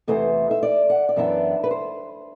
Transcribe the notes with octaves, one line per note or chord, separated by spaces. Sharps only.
E2 C3 E3 A3 C5
E5
D5
F#5
D5
F#2 E3 B3 D4 E5
B4
C5